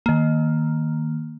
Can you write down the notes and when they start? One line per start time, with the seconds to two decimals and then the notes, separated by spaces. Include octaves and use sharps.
0.06 D#3 A#3